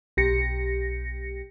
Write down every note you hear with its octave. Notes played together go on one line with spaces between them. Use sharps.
B1 G4 A#6 C#7